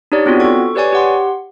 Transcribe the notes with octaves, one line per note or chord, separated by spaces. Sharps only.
D4 D#4 G4 C#5 D5
B3 C4 D4 F4 F#4
A4 C#6
G4 B4 C#5 D5 G#5 C#6
G4 F#5 C6